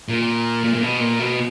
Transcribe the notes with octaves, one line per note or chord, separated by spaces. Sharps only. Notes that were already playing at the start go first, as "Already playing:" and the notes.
A#2
A#2
A#2
B2
A#2
B2